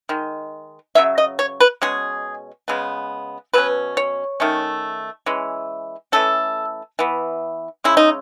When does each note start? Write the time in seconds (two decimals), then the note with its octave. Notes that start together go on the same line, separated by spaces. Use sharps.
0.09 D#3 G#3
0.95 C#3 F#3 C#4 E5
1.18 D#5
1.39 C#5
1.60 B4
1.82 B2 G#3 C#4 G#4
2.68 C#3 G#3 B3
3.54 B2 F#3 C#4 B4
3.97 C#5
4.40 D#3 A3 C#4
5.26 E3 G#3 C#4
6.12 E3 A3 C#4 A4
6.99 E3 B3
7.84 C#3 G#3 C#4 E4
7.97 D#4